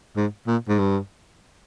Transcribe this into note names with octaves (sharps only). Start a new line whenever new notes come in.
G#2
A#2
G#2
G2